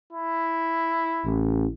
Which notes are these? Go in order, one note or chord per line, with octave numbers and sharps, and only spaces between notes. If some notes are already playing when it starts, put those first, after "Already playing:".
E4
A1